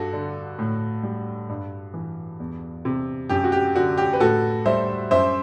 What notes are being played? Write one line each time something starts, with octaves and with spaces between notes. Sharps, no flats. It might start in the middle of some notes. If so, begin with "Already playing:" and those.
Already playing: G2 F#4 A4
D3
A2
G3
G2
E3
E2
C3
F#2 G4
F#4
G4
D3 F#4
G4
B4
A2 F#4 A4
G3 C5 E5
F#2 C5 E5